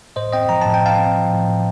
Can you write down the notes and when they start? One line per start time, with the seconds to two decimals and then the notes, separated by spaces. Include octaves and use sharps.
0.16 A2 C5 D#5
0.32 C4 D#5 G5
0.49 F3 A#5
0.62 A2 A5
0.74 G5
0.82 A2 F5 A5
0.99 C4
1.16 F3
1.31 A2
1.48 A2